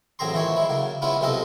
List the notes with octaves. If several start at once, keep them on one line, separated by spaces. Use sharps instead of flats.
A1 F#3 C4 G#4 A#5 C6
E3 F3 G#3 A#3 C#5
G#3 E4
C#3 F#3 A#3
G#3 B3 C#4 E4 F4
B1 C3 G#3 F4 A4 D#5